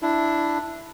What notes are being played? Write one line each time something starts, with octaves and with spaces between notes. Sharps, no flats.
D4 E4